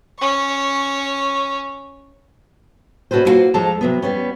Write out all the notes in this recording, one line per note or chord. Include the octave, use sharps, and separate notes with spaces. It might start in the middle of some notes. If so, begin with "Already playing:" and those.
C#4 C#6
B2 C#4 F#4 A4 B4 C5
A#3 B3 F4 F#4 C5
F2 F3 G#3 A4 A5 A#5
C3 F#3 B3
G3 B3 C#4